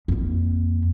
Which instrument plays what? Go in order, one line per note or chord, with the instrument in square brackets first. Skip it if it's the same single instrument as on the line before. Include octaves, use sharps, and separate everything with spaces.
[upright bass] F2 A#3